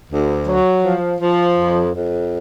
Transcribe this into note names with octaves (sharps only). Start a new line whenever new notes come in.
D2
F#3
F3
F3
F2
F2